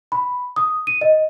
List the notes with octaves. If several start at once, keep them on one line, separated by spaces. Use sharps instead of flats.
B5
D#6
D#7
D#5